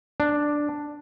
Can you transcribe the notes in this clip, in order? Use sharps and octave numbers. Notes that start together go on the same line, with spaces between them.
D4